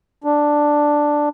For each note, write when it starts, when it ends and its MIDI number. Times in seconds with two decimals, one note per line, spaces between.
0.24 1.29 62